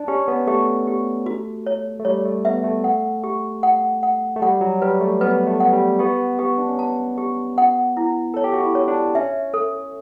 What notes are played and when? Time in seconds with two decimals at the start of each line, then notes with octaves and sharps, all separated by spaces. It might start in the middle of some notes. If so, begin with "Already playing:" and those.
Already playing: D4 D5
0.08 C#4 G4
0.28 B3
0.47 A3 G4
0.87 G4
1.26 F#4
1.66 C#5
1.99 A3
2.05 G3 C#5
2.25 A3
2.45 B3 E5
2.64 A3
2.84 F#5
3.24 G4
3.63 F#5
4.03 F#5
4.36 A3
4.42 G3 F#5
4.61 F#3
4.82 G3 B4
5.00 A3
5.21 B3 B4
5.47 A3
5.60 F#5
5.73 G3
5.99 B3 G4
6.39 B3 G4
6.58 D4
6.69 C#4
6.78 B3 A5
7.18 G4
7.58 F#5
7.97 E4
8.34 A4 C#5
8.44 G4
8.53 F#4
8.62 E4
8.75 C#5
8.88 D4
9.15 C#4 E5
9.54 A4